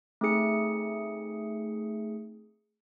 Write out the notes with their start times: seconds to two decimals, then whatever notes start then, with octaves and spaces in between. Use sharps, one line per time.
0.21 A3 C4 D#4 G#4 C#7